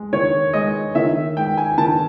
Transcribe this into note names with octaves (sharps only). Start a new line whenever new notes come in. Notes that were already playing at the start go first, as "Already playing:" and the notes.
Already playing: G#3
D#3 C#5
G#3 D#5
D#3 E5
G#3 G5
G#5
D#3 A5